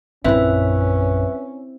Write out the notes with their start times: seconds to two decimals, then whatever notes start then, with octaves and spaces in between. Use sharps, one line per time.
0.24 A#1 F#2 C4 C#4 E4 B4 E5